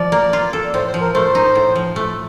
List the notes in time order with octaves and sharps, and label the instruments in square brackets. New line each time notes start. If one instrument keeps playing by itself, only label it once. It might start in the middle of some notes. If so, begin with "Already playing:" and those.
Already playing: [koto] F3 [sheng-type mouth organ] D5
[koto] A#3
F4
A4
[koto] A2 [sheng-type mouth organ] C5
[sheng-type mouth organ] C5
[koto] F3
[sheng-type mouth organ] A#4
[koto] A3 [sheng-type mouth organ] C5
[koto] D#4
A2
F3
A3